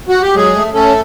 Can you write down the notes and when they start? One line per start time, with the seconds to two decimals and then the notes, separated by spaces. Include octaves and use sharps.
0.09 F#4
0.22 G4
0.35 F#3 G#3 G#4
0.55 A3
0.74 A3 C#4 A4